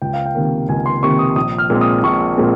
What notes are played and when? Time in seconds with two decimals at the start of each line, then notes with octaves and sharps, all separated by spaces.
0.02 C#2 G5
0.13 F5
0.26 G5
0.35 C3 D#3 A#3
0.69 C#2 G#5
0.86 C6
1.03 C3 D#3 A#3 C#6
1.19 D#6
1.36 A#1 D#6
1.58 F6
1.70 A#2 G#3 C4
1.81 D#6
2.03 A#1 C#6
2.37 A#2 G#3 C4